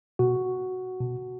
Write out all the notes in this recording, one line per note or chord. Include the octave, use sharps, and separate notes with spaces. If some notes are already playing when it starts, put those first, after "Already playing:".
B2 F#4
B2